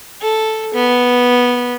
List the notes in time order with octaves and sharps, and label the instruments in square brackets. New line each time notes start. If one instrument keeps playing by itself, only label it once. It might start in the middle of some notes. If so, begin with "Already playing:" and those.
[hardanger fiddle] A4
B3